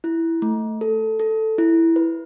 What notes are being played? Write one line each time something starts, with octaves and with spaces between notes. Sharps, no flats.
E4
A3
A4
A4
E4
B4